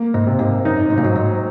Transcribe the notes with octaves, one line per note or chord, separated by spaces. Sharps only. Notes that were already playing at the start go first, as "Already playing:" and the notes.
Already playing: A#3
G#2
C3
G#2
F#2 D#4
G#2
A#2
G#2 F#3
G#2